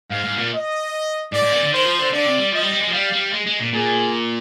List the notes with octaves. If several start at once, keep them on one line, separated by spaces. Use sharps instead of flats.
G#2 F5
G#2
A#2
D#5
G#2 D5
G#2
A#2
D3
D#3 C5
F3
D3
D3 D5
C3
G3
F3 D#5
G3
G3
G#3
F3
G3 F5
G3
G#3
G#3
A#2
A#2 G#4